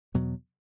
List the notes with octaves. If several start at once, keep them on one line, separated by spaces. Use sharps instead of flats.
E2 B2 F#3